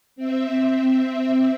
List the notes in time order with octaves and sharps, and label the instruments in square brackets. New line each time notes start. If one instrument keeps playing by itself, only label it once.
[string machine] C4 E5